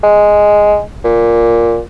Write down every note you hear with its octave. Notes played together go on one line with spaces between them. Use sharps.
G#3
A#2